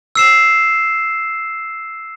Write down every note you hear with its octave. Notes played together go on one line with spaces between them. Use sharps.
E6 C7 E7